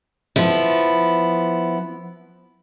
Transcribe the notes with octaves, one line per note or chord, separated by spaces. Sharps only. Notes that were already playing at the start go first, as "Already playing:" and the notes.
F3 B3 E4